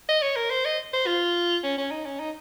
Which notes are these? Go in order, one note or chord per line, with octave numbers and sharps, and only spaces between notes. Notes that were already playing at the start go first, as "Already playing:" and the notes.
D#5
C#5
A#4
C5
D#5
C5
F4
C#4
C#4
D#4
C#4
D#4